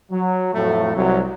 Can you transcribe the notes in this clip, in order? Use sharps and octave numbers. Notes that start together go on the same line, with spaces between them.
F#3
F2 A2 F#3 A3
C2 F#3